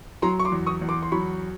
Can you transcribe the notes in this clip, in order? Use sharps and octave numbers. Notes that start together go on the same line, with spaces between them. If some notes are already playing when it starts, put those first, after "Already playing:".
F#3 A#5 C6
C#6
C6 D6
E2
C#6 D#6
E2
C6 D6
C6
F#3 B5 C#6